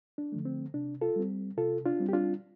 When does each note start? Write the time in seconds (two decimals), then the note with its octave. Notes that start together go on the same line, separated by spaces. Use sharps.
0.18 D4
0.32 D3 F3 A3
0.45 C4
0.74 C3 D4
1.01 F4 A4
1.16 G3 C4
1.57 C3 F4 A4
1.86 D4 F4
2.00 G3 C4
2.09 G4
2.13 D4 F4